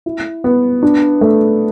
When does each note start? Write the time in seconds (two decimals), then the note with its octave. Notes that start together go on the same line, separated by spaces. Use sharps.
0.06 E4
0.44 B3
0.83 D4
1.21 A3